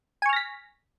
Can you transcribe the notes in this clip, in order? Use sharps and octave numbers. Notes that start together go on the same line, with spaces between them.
G#5 C#6 F6 A#6 B6